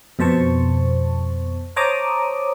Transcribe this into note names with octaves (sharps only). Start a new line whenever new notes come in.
F2 B2 C5 A5 C#6
C5 C#5 A5 A#5 D6 D#6